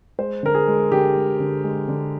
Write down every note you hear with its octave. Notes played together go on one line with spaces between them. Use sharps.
G#3 C5
D3 A#4
G#4
G#3
D3 G4
G#3
D3
G#3
D3